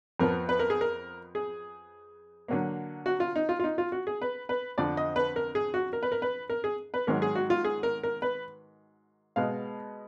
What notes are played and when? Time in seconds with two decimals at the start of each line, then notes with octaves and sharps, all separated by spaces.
0.20 F2 F3 B3 A#4
0.49 B4
0.60 A#4
0.70 G#4
0.81 A#4
1.35 G#4
2.48 D3 F#3 A#3
3.06 F#4
3.20 F4
3.35 D#4
3.49 F4
3.59 F4
3.64 D#4
3.78 F4
3.92 F#4
4.07 G#4
4.22 B4
4.49 B4
4.78 F2 D3 F3 D5
4.97 D#5
5.16 B4
5.36 A#4
5.55 G#4
5.74 F#4
5.93 A#4
6.03 B4
6.12 A#4
6.22 B4
6.50 A#4
6.64 G#4
6.94 B4
7.07 G#2 D#3 F#3 A#4
7.22 G#4
7.35 F#4
7.50 F4
7.65 G#4
7.83 A#4
8.03 A#4
8.22 B4
9.36 B2 G#3 B3 F5